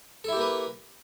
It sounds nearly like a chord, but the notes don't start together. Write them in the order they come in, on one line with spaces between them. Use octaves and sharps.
A4 E4 G4 A#3 B4